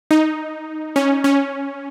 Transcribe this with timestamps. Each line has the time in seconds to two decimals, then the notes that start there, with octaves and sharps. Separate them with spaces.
0.11 D#4
0.96 C#4
1.24 C#4